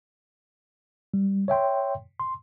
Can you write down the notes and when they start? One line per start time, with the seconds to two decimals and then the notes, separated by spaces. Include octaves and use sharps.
1.14 G3
1.48 C#5 E5 G5 C6
2.20 C6